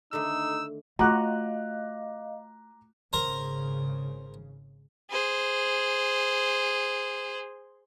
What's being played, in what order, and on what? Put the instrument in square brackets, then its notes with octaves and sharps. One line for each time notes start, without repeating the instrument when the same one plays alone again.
[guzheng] D3 D#3 A3 [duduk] D#4 [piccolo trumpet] E6
[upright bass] A3 [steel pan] F4 F#4 [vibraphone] D#5 F5 [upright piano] A#5 D6 F#6
[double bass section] G#1 C#3 [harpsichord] A#4 C5 A#5
[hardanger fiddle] G#4 C5